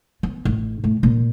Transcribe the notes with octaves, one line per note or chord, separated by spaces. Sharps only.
B3
A1
A2
A#2